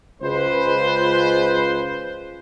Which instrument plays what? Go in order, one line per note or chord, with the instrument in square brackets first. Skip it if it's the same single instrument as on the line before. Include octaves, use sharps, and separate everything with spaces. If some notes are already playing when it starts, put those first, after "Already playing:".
[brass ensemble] C#2 G#3 F4 B4 C5